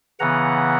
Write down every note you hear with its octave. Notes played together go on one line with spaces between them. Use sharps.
C#3 E3 B3 F#5 A#5